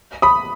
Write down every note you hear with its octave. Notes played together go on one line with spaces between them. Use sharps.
B5 D#6